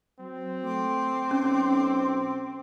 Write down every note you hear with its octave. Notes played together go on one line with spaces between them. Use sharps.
F#3 C4
A3 G5 C6 D6
B1 C#4